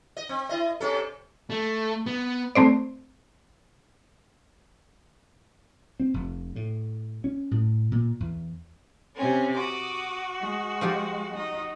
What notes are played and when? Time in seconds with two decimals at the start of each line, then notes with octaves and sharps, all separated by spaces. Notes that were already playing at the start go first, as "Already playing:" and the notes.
0.17 D#5
0.29 C4
0.49 E4 D#5
0.80 C3 C#4 A4
1.50 A3
2.06 B3
2.55 A3 C4 C5 D5
6.00 C4
6.14 F1
6.56 A2
7.24 C#4
7.51 A2
7.92 A#2
8.20 E2
9.16 C3 C4 C#4
9.56 F#4 D6 D#6
10.39 G#3
10.81 F3 F4 G4
11.33 D#4 D#5